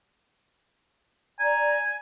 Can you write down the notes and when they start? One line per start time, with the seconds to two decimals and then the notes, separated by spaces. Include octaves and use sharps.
1.40 D5 G#5 A#5